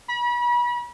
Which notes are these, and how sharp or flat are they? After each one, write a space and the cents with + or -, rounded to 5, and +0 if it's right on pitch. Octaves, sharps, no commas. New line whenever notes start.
B5 -35